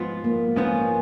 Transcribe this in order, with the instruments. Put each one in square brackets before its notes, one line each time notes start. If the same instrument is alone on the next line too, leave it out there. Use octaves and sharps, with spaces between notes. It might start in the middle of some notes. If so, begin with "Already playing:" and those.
Already playing: [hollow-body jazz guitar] G#2 F3 B3 F4
[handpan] A#3
[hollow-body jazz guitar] G#2 F3 B3 F4 [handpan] C#4